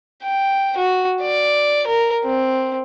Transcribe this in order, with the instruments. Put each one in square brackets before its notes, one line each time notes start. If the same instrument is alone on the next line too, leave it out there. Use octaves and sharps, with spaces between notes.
[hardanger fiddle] G5
F#4
D5
A#4
C4